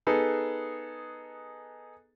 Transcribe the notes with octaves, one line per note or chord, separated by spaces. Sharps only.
B3 D#4 G#4 A4 B4